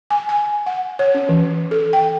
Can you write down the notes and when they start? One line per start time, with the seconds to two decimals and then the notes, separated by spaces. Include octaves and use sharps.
0.10 G#5
0.29 G#5
0.66 F#5
0.99 C#5
1.14 C#4
1.29 E3
1.71 A4
1.93 G5